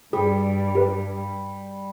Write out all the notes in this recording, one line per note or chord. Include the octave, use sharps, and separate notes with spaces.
G2 G3 G#4
G4 A#4 B4